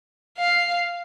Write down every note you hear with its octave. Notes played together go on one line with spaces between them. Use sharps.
F5